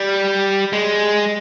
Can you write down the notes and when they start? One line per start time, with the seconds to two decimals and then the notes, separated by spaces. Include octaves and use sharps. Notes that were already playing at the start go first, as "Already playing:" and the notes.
Already playing: G3
0.73 G#3